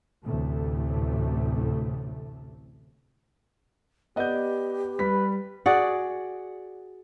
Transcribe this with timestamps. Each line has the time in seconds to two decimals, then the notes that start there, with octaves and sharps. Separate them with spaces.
0.25 A1 D2 A2 C3 A3
4.16 B3 G4 D5 D#5 F#5 G6
4.99 G3 B4 B6
5.66 F#4 G#4 D5 F#5